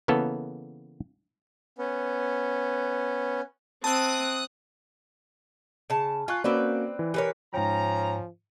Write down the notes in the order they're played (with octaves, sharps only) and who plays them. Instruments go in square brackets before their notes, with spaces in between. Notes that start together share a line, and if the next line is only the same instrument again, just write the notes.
[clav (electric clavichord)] C#3 E3 A#3 B3 A4
[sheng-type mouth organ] B3 C#4
[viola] C4 [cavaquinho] E5 A5 [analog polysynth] D#6 F#6
[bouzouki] C#3 A5
[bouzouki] F4 [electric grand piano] G#5 C#6 F#6
[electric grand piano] A#3 C#4 F#4 [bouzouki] C4 B4 D5
[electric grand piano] E3
[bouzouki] E3 B4 C#5 [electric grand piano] G4 A#4
[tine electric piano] G#2 G5 [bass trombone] F3 [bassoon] C#4 [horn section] A#5